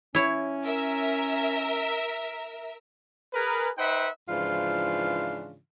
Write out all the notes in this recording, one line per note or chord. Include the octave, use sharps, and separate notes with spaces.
C#4 E4 C#5
A#4 E5
G#4 A#4 B4
D#4 B4 C5 E5 F#5 G5
G#2 C#3 E3 F3 D4 F4